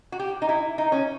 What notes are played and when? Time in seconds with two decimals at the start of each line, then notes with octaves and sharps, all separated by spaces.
0.12 F#4
0.19 G4
0.42 D#4
0.49 E4
0.78 D#4
0.92 C#4